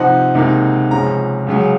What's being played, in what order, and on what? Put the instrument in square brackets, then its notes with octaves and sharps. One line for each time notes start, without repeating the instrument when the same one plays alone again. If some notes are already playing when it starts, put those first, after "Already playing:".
Already playing: [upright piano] C3 F3 C4 D#4 F#5
C#2 C3 D#3 A#3 D#4
C#2 C3 F3 G#3 C#4 A#5
C#2 C#3 F#3